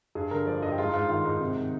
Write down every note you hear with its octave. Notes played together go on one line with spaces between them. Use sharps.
G2 G#4
D3 A#4
F3 D5
G2 D#5
G4
G#2 F4
D#4
G#2 F4
D#3 F4
G#2 D#4
C3
D#3